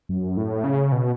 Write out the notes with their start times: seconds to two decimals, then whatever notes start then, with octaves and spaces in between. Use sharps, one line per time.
0.09 F#2
0.37 A2
0.64 C#3
0.92 B2